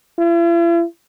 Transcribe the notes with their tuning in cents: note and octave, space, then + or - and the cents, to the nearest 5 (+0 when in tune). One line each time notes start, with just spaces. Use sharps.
E4 +45